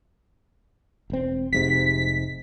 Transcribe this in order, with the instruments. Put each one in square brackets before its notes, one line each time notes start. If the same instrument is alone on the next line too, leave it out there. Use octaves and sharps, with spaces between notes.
[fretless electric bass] E1 C4
[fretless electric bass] F1 G#2 C3 [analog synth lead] B6